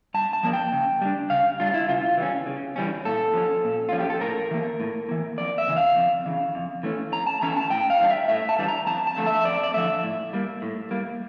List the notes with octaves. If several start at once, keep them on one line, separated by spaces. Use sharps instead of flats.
G2 A5
A5
F3 A#3 D4
G5
C#3
G3 D4
C#3 F5
G3 D4 F4
E4
C#3 F4
E3 G3 C#4
C#3
E3 G3 C#4
A#2 A4
F3 C#4
A#2
F3 C#4 F4
G4
A4
A2 A#4
E3 A#3
A2
E3 A#3
F2 D5
E5
C#3 E3
F5
F2
C#3 E3
F2
E3 A3 C#4
F2 A#5
A5
E3 A3 C#4 A#5
A5
A2 G5
F5
E3 G3 D4
E5
A2 E5
A5
E3 G3 D4
A#5
F2 A5
A5
D3 F3 A3
E5
F2 D5
D5
D3 F3 A3 E5
A2
G3 A#3
A2
G3 A#3